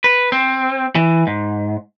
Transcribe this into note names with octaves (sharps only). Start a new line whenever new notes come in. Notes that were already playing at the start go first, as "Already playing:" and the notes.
B4
C4
E3
G#2